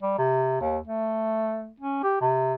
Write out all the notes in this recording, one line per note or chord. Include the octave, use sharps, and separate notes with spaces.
G3
C3
D#2
A3
C#4
G4
C3